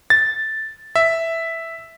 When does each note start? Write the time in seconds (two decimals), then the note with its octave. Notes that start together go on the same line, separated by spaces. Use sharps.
0.10 A6
0.95 E5